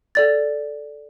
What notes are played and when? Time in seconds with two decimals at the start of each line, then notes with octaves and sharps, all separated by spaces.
0.15 A4 D5 A6